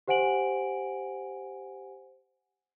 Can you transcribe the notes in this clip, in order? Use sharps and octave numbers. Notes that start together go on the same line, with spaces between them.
G4 C5 F#5 G#5 D7 F#7